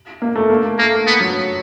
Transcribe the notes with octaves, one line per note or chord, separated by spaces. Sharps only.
A#3
A3
A#3
A3 A#3
B3
F#3